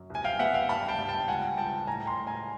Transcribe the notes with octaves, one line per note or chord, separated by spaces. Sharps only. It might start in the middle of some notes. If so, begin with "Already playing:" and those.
Already playing: F#2
C2
G#5
F5 G5
B3 E5 F#5
F5 G5
G2 A5 B5
G5 A5
G2
G5 A5
C#2 F#5 G#5
C#2 G5 A5
A2 G#5 A#5
A#5 C6
A2
G#5 A#5